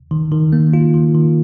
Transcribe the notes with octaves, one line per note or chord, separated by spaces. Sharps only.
D#3
D#3
A#3
F4
D#3
D#3